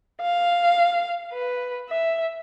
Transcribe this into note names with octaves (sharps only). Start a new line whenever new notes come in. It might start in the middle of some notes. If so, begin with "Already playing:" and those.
F5
B4
E5